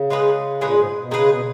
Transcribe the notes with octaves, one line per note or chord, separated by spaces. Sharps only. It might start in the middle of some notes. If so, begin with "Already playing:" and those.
Already playing: C#3
G#3 D#4 G#4 B4
A#2 G#3 D#4 G#4 B4
G#2
B2
C#3 G#3 D#4 G#4 B4
B2